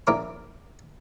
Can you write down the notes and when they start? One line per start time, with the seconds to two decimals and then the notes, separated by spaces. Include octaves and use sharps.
0.07 A#1 E4 A#4 D6